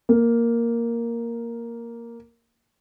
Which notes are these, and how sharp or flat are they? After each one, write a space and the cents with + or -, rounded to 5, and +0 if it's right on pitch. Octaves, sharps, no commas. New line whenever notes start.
A#3 +0